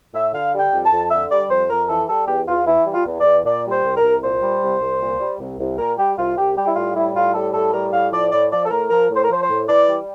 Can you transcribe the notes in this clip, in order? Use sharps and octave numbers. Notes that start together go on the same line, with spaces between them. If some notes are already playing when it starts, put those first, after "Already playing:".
A2 E5
D3 F5
G3
G5
F2
A5
F2
D3 E5
G3 D5
F2 C5
F2 A#4
E3 A4
G3 A4
E2 G4
E2 F4
E3 E4
G3
F4
E2
D5
E2
A#2 D5
G3
C5
C2
A#4
C2
A#2 C5
G3
C2
C2
A#2
G3
C2
C2
A#2 A#4
G3 G4
C2 F4
C2 G4
G3 G4
E4
A2 F4
G3 E4
A2 F4
G3 A4
A2 A4
G3 A#4
A2 F5
F3 D5
A2 D5
F3 D5
A4
A2 A#4
F3 A#4
A2
C5
A#4
F3 C5
C5
A2
E3 D5
G3